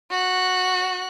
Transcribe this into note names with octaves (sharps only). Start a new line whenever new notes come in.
F#4 F#6